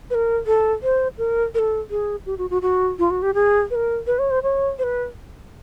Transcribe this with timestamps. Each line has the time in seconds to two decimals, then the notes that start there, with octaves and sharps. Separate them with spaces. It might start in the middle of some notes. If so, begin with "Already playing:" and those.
0.10 B4
0.15 A#4
0.46 A4
0.83 C5
1.18 A#4
1.54 A#4
1.59 A4
1.91 G#4
2.26 G4
2.38 F#4
2.50 F#4
2.62 F#4
2.99 F4
3.10 F#4
3.22 G4
3.34 G#4
3.71 B4
3.75 A#4
4.07 B4
4.19 C#5
4.31 C5
4.43 C#5
4.79 C5
4.83 B4